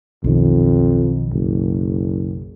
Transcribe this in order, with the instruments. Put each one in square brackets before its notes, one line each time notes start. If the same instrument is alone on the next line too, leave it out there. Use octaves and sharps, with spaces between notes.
[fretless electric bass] B1 D#3 [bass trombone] F2
[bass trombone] F#1